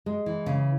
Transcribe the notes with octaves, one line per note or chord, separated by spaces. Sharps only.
G#3
E3
C#3